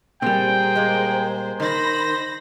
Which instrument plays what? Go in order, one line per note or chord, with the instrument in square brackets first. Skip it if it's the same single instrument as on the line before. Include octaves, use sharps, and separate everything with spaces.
[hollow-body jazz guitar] A#2 G3 [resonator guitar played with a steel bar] C4 [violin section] G#4 A#4 C5 [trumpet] G5
[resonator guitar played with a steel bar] G#3 A#3
[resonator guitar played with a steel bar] D#3 [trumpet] C5 [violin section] B5 A#6